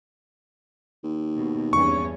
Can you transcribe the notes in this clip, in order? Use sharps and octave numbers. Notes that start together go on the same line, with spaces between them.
D#2
B2
E2 G2 C#4 C#6